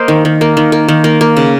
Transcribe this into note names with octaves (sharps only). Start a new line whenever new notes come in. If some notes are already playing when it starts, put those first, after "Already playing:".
Already playing: A#3 C5 D#5
D#3
D#3
A#3
D#3
A#3
D#3
A#3
A#3
C#3